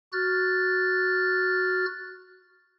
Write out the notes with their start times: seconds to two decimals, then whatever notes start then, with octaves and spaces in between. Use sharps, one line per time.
0.13 F#4 F6 F#6 A6